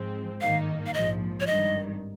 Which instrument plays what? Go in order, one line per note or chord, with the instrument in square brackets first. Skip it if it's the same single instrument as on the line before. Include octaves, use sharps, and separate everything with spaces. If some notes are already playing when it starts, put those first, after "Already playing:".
Already playing: [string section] G#2 F3 G#3 C4
[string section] G#1 G2 D#3 A#3 D#4 [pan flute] F5
[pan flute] F5
[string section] A#1 G#2 F3 [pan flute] D#5
[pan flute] C#5
[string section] G#1 G2 D#3 [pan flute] D#5